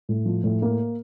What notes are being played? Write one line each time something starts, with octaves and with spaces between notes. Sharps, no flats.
A2
F3
A2
A#3